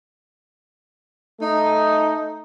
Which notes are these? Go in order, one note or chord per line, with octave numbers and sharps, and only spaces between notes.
A3 D#4